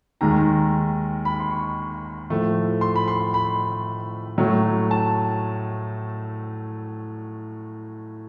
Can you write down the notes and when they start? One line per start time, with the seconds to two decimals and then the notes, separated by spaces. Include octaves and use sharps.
0.21 D#2 D#3 G#3 A#5
1.25 B5
1.40 C6
1.51 C#6
2.30 A2 F3 A3
2.81 C6
2.96 B5
3.08 C6
3.34 B5
4.38 A2 F#3 A3
4.91 A5